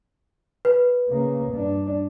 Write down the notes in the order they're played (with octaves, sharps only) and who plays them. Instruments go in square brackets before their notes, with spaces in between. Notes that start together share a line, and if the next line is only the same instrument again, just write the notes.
[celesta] B4
[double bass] C#3 A#3
G2 D4